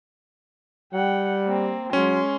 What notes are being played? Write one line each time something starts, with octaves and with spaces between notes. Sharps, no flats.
G3 F#5 G5
A#3 C4
F#3 G#3 C#4 C6